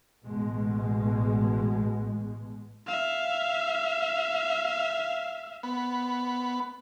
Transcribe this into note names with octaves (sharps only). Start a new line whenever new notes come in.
A1 B2 G#3
E5 F5
B3